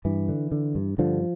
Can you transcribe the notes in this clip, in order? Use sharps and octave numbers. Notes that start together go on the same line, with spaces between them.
G2 E3
D3
D3
G2
G2 D3 F3